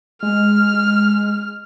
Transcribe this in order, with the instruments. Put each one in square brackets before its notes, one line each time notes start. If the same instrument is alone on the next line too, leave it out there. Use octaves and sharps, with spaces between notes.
[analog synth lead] G#3 [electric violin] F6